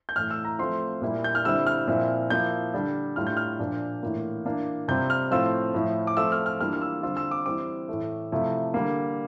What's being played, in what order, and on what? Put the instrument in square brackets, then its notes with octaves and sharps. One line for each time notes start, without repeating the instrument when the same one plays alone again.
[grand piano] G6
A2 E3 A3 F6
E6
A#5
F3 A3 C4 F4 C6
A#2 G3 A#3 E4
G6
F6
D3 G3 C4 E4 E6
F6
A#2 F3 C4 E4
F3 A#3 E4 G6
D3 G3 D4
A2 G3 D4 F4 F6
G6
F6
A#2 F3 A#3 D4
A2 E3 A#3 F4
E3 A#3 D4
C3 G3 C4 F4 G6
F6
A2 F3 A3 C4 F4 E6
A2 F3 A3 E4
D6
F3 A3 C4 F4 E6
F6
F6
E3 G3 A#3 D4 F4 F6
F6
E6
D3 G3 C4 F4 E6
E6
D6
E3 G3 C4 D6
A2 E3 A3
C3 F3 A3 E4
D3 G3 A#3